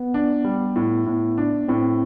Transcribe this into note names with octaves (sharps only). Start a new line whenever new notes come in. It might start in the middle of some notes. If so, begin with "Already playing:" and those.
Already playing: B3
D4
G3
A2
A2
D4
A2 C4